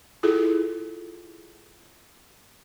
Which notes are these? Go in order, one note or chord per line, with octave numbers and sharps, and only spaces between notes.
E4 F4 G#4 A4